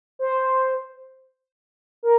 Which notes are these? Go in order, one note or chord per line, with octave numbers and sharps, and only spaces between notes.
C5
A#4